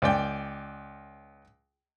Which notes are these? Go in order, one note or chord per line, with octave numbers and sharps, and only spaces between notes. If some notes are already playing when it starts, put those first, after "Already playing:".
C#2 D5 G5